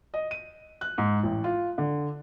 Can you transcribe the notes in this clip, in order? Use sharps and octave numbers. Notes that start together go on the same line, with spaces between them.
D#5
D#7
F#6
G#2
A1
F4
D3